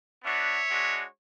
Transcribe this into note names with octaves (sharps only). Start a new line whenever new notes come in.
B3 D4 F#4 C#5 E5
G#3 D4 F#4